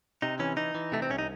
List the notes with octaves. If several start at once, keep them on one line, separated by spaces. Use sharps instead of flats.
C3 D#4
E3 C#4
E3 D#4
E3
C3 A3
C4
C2 C#4
D#4